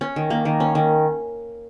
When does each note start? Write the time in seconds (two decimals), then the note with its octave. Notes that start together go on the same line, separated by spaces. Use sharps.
0.01 C#4
0.16 D#3
0.30 A#3
0.45 D#3
0.60 C#4
0.75 D#3